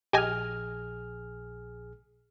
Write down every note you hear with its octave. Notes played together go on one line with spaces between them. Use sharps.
A#1 G4 G#4 D#5 G#5 F6